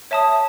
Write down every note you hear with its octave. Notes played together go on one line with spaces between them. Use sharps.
C#5 E5 A5 D#6